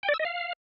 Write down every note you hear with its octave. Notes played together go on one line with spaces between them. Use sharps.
G5
D5
E6
D#5
F5